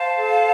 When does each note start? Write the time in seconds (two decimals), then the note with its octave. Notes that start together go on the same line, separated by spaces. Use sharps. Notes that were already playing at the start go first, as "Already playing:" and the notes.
Already playing: C5 F5 A5
0.15 A4